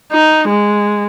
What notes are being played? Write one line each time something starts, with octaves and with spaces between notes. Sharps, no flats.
D#4
G#3